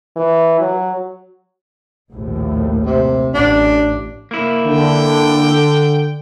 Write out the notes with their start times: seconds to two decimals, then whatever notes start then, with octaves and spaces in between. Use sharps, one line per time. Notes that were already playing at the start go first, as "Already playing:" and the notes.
0.17 E3
0.60 F#3
2.12 A#1 D#2 A2
2.86 C3
3.34 A1 D4
4.31 A#3 E4
4.66 D3 G5